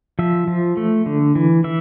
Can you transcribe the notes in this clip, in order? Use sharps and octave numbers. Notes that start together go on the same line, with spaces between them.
F3 E5
F3
A3
D3
E3
E3 E5